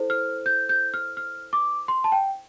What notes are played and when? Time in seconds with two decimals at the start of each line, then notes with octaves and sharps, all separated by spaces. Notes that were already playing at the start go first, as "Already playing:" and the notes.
Already playing: E4 A4 C5
0.10 F6
0.46 G6
0.69 G6
0.94 F6
1.17 F6
1.53 D6
1.88 C6
2.04 A5
2.12 G5